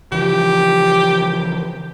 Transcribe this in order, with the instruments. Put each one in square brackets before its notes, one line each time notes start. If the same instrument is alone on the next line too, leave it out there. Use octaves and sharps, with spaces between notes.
[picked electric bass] C#3 E3 F3 [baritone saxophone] G4